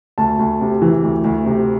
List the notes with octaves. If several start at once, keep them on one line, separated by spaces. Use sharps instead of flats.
D2 A5
D2
C3
E3
D2
D2
C3